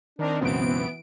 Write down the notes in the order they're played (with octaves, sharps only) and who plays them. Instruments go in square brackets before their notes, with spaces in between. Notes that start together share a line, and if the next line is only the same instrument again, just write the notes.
[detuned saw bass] D#3 [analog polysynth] C4 D#4 A#4 [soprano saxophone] D4
[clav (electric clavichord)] C#2 F#2 B2 [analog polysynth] E3 D7 [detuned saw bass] B3 [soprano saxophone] C4